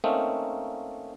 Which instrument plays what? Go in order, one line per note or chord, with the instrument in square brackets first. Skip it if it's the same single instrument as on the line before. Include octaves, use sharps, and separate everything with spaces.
[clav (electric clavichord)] A3 A#3 C4 C#4 D#4